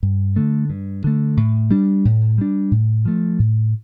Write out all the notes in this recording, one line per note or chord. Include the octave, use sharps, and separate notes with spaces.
G2
D3 A3
G2
D3 A3
A2
G3 D4
A2
G3 D4
A2
F3 A3
A2